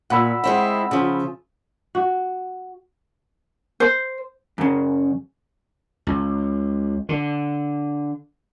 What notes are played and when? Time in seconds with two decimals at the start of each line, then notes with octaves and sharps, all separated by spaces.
0.10 A#2 F#5 B5 E6
0.44 G#3 C4 E4
0.91 C#3 F3
1.95 F#4
3.80 C5
4.58 F#2 C#3
6.07 C#2
7.09 D3